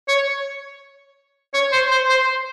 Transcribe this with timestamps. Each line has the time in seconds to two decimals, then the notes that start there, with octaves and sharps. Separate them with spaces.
0.08 C#5
1.54 C#5
1.72 C5
1.91 C5
2.09 C5